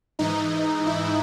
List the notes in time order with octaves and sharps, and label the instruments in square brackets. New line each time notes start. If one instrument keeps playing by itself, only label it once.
[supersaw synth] G#2 E3 D#4
E4